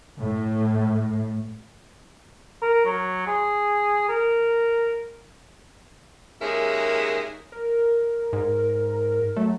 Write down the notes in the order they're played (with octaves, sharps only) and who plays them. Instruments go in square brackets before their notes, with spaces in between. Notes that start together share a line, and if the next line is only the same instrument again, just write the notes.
[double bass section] A2
[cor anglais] A#4
F#3
G#4
A#4
[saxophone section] D#2 G#3 C#4 G#4 A#4 E5
[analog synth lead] A#4
[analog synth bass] G#2
[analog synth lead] F#3 [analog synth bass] A3